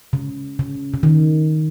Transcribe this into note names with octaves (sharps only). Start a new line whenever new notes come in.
C#3
C#3
C#3
D#3